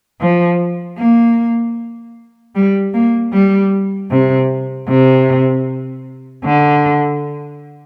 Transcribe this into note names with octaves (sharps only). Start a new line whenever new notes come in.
F3
A#3
G3
A#3
G3
C3
C3
D3